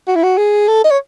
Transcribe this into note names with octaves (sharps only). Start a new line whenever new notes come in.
F#4
E4
F#4
G#4
A4
D#5
C#5